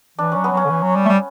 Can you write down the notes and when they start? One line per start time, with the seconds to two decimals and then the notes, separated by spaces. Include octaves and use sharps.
0.18 E3 D4
0.32 F#3 C#4
0.44 B3
0.52 F#3 C#4
0.65 D3
0.70 E3
0.82 F#3
0.95 G3
1.05 A3
1.08 G3